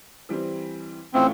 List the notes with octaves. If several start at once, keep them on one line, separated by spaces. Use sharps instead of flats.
E3 G3 C4
A2 E3 A3 C4 C#4 F4